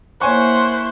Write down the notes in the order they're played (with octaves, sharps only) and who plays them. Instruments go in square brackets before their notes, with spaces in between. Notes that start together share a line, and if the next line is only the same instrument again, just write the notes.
[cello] A#3 E4 [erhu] C5 [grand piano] C#5 G#5 C#6 [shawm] F#5